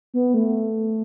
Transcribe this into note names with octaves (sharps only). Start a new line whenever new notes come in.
B3
A3